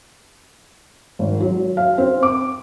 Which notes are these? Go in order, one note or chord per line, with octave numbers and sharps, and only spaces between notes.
G#1
F#3
F5
C4
D6